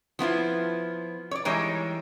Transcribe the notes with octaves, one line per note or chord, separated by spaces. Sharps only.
F3 B3 E4 F4
C#5 D5
E3 G3 G#3 D#4 A#4 C#5